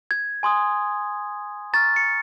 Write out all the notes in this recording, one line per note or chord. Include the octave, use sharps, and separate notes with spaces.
G#6
G#5 C6 D#6
A#5 C#6 F6 A6
C#7